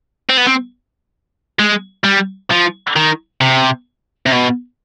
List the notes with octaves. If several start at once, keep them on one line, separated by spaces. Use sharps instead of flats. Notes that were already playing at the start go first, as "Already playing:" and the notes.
C4
B3
C4
G#3
G3
F3
D#3
C3
C3
B2